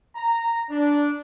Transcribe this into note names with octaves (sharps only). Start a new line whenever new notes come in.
A#5
D4